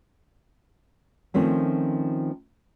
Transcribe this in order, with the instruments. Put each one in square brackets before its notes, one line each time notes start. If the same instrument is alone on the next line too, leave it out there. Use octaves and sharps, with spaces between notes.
[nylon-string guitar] D#3 F3 A3 C4 C#4